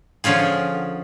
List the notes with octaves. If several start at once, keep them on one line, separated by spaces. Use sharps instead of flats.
D3 F3 C#4 F4 G#4